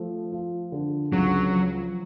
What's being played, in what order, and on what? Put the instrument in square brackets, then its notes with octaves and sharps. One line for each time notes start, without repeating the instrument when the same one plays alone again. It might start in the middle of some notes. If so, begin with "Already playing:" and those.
Already playing: [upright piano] F3 A3
F4
D3
[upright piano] C#2 [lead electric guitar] F#3
[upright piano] F3